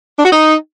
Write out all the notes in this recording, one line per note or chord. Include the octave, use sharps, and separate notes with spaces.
D4
F#4
D#4